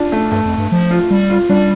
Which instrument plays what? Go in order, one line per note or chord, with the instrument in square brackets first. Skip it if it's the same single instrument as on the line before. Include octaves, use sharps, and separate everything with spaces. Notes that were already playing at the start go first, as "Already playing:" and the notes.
Already playing: [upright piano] D4 F4
A3
[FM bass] G2 [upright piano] A3
[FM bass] F2
G2
F3
[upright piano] F4
[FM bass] G3
[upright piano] F4
[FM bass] G3 [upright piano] D4